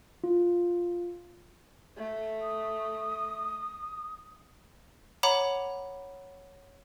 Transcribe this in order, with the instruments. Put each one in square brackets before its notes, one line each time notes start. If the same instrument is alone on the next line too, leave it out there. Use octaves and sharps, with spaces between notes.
[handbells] F4
[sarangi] A3
[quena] D#6
[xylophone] C#5 F#5 A#5 B5 D6